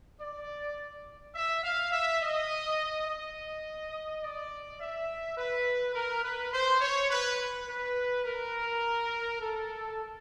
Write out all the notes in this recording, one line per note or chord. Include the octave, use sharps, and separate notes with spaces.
D5
E5
F5
E5
D#5
D#5
D5
E5
B4
A#4
B4
C5
C#5
B4
B4
A#4
A4